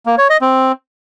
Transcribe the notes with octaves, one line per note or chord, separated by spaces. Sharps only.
A#3
C#5
D#5
C4